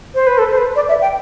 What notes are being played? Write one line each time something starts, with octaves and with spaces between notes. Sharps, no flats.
C5
B4
A4
C5
B4
D5
E5
G5